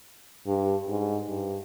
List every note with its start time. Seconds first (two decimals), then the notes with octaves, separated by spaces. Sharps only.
0.47 G2
0.88 G#2
1.28 G2